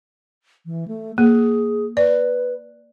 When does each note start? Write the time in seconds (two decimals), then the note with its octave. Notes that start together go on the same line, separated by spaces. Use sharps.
0.66 E3
0.88 A3
1.18 A#3 G#4
1.97 B4 D5